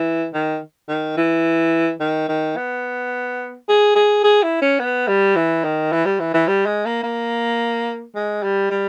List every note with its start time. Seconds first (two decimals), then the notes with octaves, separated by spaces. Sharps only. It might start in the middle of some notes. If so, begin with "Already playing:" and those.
Already playing: E3
0.34 D#3
0.88 D#3
1.17 E3
2.00 D#3
2.28 D#3
2.57 B3
3.69 G#4
3.95 G#4
4.24 G#4
4.43 E4
4.62 C#4
4.79 B3
5.08 G3
5.36 E3
5.64 D#3
5.92 E3
6.05 G3
6.20 E3
6.34 E3
6.48 G3
6.66 G#3
6.85 A#3
7.03 A#3
8.15 G#3
8.43 G3
8.70 G3